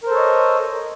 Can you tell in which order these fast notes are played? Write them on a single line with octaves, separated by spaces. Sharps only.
A#4 C5 A4 C#5 D#5